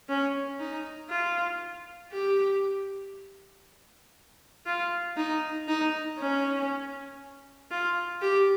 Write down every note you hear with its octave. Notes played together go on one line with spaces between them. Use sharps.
C#4
D#4
F4
G4
F4
D#4
D#4
C#4
F4
G4